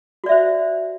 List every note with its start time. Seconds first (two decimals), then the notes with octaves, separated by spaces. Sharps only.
0.24 F#4
0.26 D5
0.29 E5
0.32 C5